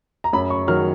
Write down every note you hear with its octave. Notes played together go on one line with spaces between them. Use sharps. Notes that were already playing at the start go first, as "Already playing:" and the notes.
A#5
F#2 B5
C#6
D#3 F#3 F6